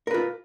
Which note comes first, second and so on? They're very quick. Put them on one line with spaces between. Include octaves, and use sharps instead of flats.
A#4 B4 F4